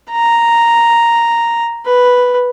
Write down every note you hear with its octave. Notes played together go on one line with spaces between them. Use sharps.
A#5
B4